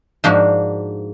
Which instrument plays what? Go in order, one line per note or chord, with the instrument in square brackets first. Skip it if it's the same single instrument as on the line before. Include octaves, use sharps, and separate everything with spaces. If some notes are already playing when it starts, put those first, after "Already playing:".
[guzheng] G#2 F3 A#3 D4 F#4